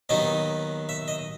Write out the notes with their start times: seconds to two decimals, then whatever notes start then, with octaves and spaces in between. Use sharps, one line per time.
0.09 D#2 D#3 F#3 B3 D#4 D#5
0.89 E5
1.08 D#5